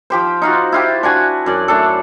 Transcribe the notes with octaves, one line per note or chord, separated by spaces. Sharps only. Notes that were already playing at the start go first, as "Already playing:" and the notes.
F3 G4 C5
D#4 F4 F#4
E4 F4 G4
D4 F#4 G#5
F#2 D5
A3 D4 A4